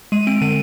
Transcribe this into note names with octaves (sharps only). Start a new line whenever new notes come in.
G#3 D#7
C4 D7
D3 D#7